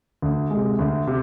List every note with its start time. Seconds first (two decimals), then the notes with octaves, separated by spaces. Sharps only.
0.22 D2
0.50 G#3
0.56 C3
0.79 D2
1.07 C3